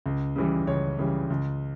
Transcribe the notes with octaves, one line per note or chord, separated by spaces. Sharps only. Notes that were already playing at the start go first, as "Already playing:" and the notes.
C#2
C#3 E3 G3
C#2 C#5
C#3 E3 G3
C#2